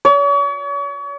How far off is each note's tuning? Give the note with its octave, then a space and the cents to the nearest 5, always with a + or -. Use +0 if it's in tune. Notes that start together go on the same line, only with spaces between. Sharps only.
C#5 +40